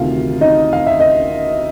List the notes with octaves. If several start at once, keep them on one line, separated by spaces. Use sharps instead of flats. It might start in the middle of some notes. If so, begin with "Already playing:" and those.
Already playing: D2 C3 D#3 F4 F5
D#4 D#5
F5
E5
D#5